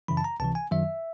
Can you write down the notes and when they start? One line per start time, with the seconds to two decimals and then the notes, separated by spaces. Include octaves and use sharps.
0.08 F#2 C#3 E3 B5
0.17 A5
0.24 A#5
0.40 C#2 C3 E3 A5
0.55 G#5
0.71 F#2 D#3 F#3 E5